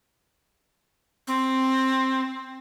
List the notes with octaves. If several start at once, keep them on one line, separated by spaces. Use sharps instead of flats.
C4